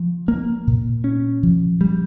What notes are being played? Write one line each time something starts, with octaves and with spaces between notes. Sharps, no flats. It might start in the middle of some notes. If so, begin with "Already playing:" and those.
Already playing: F3
A#3
A#2
C#4
F3
G3